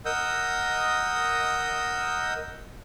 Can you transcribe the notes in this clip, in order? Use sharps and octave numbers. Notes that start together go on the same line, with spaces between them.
A#4 D#5 F#5 D#6 E6 G6